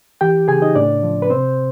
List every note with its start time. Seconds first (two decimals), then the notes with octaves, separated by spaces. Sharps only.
0.21 E3 G4 G5
0.48 C#3 G#4 G#5
0.62 D#4 D#5
0.75 A2 D4 D5
1.03 F3
1.22 B4
1.30 C3 C4 C5